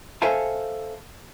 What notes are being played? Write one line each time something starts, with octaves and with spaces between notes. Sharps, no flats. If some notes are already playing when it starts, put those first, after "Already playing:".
A4 C5 E5 F5 G#5 A5